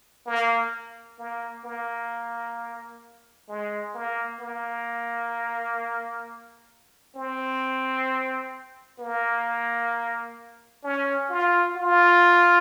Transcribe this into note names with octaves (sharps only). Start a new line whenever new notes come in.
A#3
A#3
A#3
G#3
A#3
A#3
C4
A#3
C#4
F4
F4